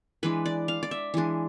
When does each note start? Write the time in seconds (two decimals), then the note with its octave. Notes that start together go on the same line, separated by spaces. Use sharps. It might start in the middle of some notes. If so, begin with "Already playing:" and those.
0.23 E3 G#3 D4 B4
0.46 D5
0.68 F5
0.83 D5
0.91 E5
1.14 E3 G#3 D4